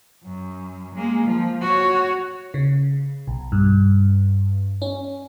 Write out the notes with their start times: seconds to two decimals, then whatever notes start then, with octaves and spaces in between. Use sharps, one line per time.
0.24 F#2
0.95 G#3 A#3
1.27 F3
1.61 F#4 C#5
2.54 C#3
3.27 B1
3.52 G2
4.82 C#4